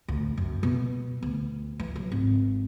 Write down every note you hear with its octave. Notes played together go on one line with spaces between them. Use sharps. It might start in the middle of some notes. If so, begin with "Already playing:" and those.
D2
F#2
B2
D2
E3
F#3
G#1